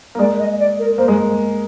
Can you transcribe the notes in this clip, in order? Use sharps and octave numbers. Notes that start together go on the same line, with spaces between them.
A#3
G#3 D5
D#5
D5
A#4
A#3 C5
G#3